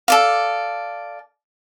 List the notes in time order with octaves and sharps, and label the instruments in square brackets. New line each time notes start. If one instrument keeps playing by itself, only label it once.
[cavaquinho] A4 D5 F5